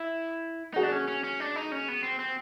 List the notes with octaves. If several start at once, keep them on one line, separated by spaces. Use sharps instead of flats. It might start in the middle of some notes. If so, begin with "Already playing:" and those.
Already playing: E4
D#4 F#4 G#4
D4
C#4
C#4
C#4
D4
D#4
C#4
B3
C4
C4